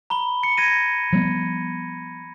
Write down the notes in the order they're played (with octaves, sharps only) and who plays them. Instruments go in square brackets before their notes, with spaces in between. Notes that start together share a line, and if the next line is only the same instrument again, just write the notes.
[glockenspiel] A#5 B5 G7
C#7
G#6 A#6 D#7
[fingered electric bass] F3 G3 B3